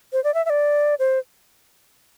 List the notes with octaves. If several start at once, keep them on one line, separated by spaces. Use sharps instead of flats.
C5
D5
E5
E5
D5
C5